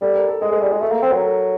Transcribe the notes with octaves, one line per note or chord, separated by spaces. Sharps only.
G3 A4
A#4
A4
G#3 G#4
G#3 A4
G3 G#4
G#3 F#4
A3 A4
A#3
C4
F#3 A#4
A4